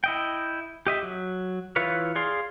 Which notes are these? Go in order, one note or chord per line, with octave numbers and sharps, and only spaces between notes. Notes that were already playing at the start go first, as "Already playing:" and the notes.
E4 D#5 G5
G4 D#5 E5
F#3
E3 E4 F4 B4 C#5
G#4 D5 F5 C6